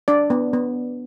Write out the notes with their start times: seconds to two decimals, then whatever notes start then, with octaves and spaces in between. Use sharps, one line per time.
0.08 D4 D5
0.30 B3
0.53 B3